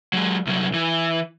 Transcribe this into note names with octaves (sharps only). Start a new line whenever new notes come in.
F#3 G#3
C2 F#3
E3